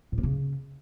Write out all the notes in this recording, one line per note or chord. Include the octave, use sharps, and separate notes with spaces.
A2
A#3
C#3